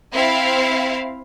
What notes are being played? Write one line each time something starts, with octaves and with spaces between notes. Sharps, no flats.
C4 E4 F5